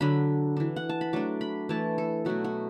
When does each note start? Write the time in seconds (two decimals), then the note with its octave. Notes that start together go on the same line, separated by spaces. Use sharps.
0.01 D3 F#3 D4 B5
0.57 E3 D4
0.76 F#5
0.89 A5
1.01 B5
1.13 F#3 A3 D4 D6
1.41 B5
1.69 E3 A3 E4 A5
1.98 A4
2.25 B2 F#3 A3 E4 F#4
2.44 F#4